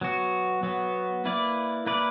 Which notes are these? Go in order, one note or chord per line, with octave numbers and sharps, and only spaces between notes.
F#3 B3 F#4
F#3 B3 F#4
A#3 E4 B4 D5
A#3 E4 B4 D5